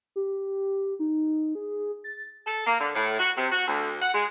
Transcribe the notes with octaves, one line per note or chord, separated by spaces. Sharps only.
G4
D#4
G#4
A6
A4
A#3
D3
A2
F#4
C3
F#4
D2
F#5
G#3